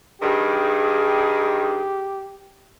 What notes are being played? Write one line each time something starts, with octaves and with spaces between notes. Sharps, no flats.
G2 D#3 G4 G#4